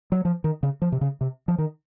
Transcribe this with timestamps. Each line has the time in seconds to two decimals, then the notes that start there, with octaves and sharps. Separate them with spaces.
0.12 F#3
0.25 F3
0.44 D#3
0.63 C#3
0.82 F3
0.92 C3
1.01 C#3
1.21 C3
1.48 F3
1.58 D#3